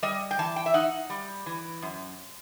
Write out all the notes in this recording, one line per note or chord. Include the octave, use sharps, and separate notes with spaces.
G3 D#5
G5
E3 A5
G5
E5
D#4 F#5
G3
E3
F#2